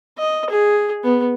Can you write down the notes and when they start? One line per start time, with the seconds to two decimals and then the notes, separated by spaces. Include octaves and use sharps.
0.18 D#5
0.50 G#4
1.04 B3